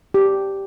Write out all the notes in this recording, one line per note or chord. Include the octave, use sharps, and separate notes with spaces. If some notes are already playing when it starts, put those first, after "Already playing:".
G4